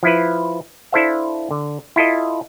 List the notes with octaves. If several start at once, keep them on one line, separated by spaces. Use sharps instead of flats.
F3 E4 B4
D4 E4 A4 C5 E5 F5
D3
E4 F4 A4 D#5